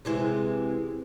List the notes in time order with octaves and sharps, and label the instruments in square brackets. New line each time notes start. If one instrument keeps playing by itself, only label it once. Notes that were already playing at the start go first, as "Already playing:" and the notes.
[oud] C3 E3 G#3